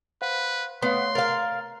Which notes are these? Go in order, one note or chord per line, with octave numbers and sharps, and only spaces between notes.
B4 C5 F5 F#5
A3 B3 C#5 F5 C6
A#4 F5 A6